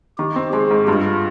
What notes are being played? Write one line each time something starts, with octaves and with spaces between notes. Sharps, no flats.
D#3 G4
C4
G#3 G4
G#2
G2 F4